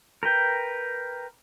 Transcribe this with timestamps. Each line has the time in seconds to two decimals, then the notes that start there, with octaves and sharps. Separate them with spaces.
0.23 A#4 B4 G5